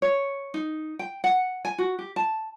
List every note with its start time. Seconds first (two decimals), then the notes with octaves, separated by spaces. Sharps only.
0.02 C#5
0.54 D#4
0.99 G5
1.24 F#5
1.65 G#5
1.78 F#4
1.99 G4
2.16 A5